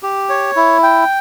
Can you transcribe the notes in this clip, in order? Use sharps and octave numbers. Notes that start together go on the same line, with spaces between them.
G4
C#5
E4
G5